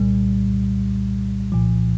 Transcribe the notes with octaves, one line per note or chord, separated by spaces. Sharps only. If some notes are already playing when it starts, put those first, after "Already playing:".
Already playing: C2 A#2 G3
C2 A#2 F3